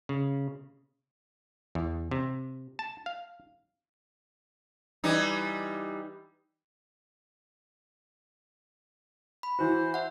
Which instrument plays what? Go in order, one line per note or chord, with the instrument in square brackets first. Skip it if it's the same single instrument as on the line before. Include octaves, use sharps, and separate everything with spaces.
[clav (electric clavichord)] C#3
E2
C3
A5
F5
[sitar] E3 G3 D#4
[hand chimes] B5
[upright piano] E3 F#4 [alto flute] C5
[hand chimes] E5 F#5